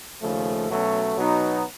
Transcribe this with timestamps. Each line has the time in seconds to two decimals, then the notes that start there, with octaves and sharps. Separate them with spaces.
0.21 D#2 C#3 F3 A3
0.68 B2 F#3 A3 C#4
1.16 B2 F#3 B3 D#4